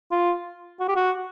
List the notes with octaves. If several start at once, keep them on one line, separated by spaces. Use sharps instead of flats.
F4
F#4
G4
F#4